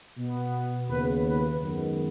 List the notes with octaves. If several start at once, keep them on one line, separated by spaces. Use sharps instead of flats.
B2 B3
D#2 C#3 B3 B4
B4
F#2 D#3 G#3 B3